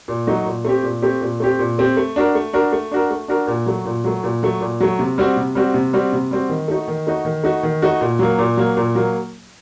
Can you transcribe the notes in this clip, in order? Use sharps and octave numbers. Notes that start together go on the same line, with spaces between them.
A#2
F#3 A3 D#4 F#4
A#2
A3 C4 G4
A#2
A3 C4 G4
A#2
A3 C4 G4
A#2
A3 C4 G4
A3
D4 F#4 A#4
A3
D4 F#4 A#4
A3
D4 F#4 A#4
A3
D4 F#4 A#4
A#2
F#3 A3
A#2
F#3 A3
A#2
F#3 A3
A#2
F#3 A3
C3
G3 C4 F#4
C3
G3 C4 F#4
C3
G3 C4 F#4
C3
G3 C4 F#4
D#3
A3 D#4 F#4
D#3
A3 D#4 F#4
D#3
A3 D#4 F#4
D#3
A3 D#4 F#4
A#2
F#3 A#3
A#2
F#3 A#3
A#2
F#3 A#3